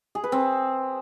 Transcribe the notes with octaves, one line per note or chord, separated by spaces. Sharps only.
G#4
B4
C4